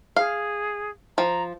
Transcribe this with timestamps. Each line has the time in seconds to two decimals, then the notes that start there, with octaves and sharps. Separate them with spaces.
0.16 G#4 F5
1.18 F3 A#5